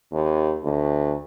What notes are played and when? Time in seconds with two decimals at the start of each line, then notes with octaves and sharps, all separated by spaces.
0.12 D#2
0.64 D2